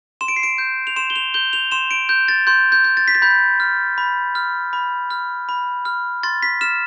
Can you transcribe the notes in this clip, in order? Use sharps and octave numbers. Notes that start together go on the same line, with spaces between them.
C6 E7
D7
C7
D7
G6
F7
C6 E7
G7
F7
G6 G7
F7
C6 E7
D7
G6
A6
C6 G6
G6
G6
A6
B6
A6
B5 G6
F6
B5
F6
B5
F6
B5
F6
C6 A6
B6
F6 E7